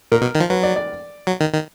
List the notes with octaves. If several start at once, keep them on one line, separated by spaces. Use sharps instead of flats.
A#2 A#4
B2
D#3
F3
F#3 B4
D5
D5
F#3
D#3
D#3